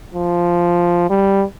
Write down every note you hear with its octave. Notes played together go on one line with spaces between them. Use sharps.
F3
G3